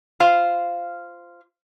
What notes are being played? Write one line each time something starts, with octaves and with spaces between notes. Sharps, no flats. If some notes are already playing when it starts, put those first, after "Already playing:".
F4 C5 F5